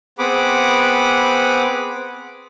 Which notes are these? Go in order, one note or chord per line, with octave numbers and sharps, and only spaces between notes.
B3 C4 G#4 F#5 B5 D6